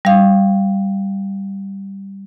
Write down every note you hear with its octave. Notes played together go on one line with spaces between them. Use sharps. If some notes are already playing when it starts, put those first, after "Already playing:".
G3 F5